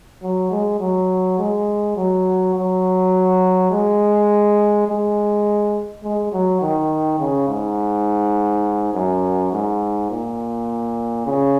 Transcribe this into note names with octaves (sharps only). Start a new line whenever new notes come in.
F#3
G#3
F#3
G#3
F#3
F#3
G#3
G#3
G#3
F#3
D#3
C#3
G#2
F#2
G#2
A#2
C#3